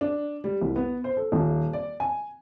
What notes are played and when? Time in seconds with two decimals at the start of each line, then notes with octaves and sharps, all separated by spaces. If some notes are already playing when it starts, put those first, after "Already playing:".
0.01 D4
0.44 G3
0.62 C2
0.76 B3
1.04 C5
1.17 A4
1.32 D#1
1.73 D5
2.00 G#5